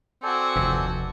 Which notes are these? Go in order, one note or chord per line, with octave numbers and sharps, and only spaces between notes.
C4 F#4 A4 D5 G#5
F1 D#2